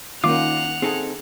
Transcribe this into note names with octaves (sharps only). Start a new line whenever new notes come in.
D#3 A#3 C#4 D#4 F4 F#5 D6 F7
C4 D#4 G#4 A4